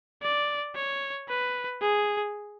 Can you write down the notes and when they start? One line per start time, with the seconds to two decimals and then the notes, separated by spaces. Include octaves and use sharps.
0.22 D5
0.75 C#5
1.28 B4
1.82 G#4